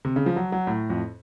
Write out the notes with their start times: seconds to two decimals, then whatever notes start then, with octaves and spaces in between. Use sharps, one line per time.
0.05 C3
0.16 C#3
0.26 F3
0.36 F#3
0.52 F#3
0.67 A2
0.90 F2